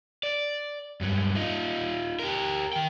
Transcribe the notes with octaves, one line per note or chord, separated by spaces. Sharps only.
D5
G2 F#3
D#4 F4
G4 A#4
D#3 G5